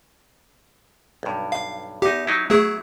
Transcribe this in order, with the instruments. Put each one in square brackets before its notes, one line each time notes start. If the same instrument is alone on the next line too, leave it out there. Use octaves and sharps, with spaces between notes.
[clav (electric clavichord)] B1 G2
[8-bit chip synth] F5
[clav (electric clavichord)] E2 D#4 [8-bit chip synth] G4
[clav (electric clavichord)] F#3 D#4 E4
[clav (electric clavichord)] F#3 E4 [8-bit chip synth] A3 G#4